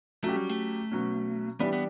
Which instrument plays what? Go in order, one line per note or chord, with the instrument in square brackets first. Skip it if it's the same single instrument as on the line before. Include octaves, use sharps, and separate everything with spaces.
[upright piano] F#3 C#4 G4 [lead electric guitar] A3
[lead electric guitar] G3
A3
[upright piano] B2 F#3 C#4
[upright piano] E3 G3 D4 G4 [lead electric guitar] B3
[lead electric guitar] B3